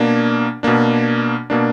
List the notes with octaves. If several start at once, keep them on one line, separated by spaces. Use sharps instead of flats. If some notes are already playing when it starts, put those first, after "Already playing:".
Already playing: B2 A#3 D4
B2 A#3 D4
B2 A#3 D4